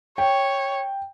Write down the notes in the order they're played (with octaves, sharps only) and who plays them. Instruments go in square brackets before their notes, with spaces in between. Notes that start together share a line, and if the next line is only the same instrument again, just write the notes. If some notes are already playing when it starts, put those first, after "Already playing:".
[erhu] C#5 [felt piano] G5